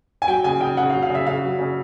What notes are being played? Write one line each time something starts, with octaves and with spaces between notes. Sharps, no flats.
G#5
F#3 G5
C#3 G#5
C#3 G5
C#3 F#5
F5
F#3
F5
C#3 E5
C#3 F5
F#3
C#3